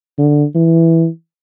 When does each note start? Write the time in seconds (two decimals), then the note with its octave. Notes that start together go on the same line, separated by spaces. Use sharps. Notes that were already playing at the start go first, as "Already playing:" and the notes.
0.18 D3
0.55 E3